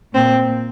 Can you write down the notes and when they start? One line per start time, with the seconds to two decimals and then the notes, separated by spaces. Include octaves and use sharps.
0.14 A#2 C4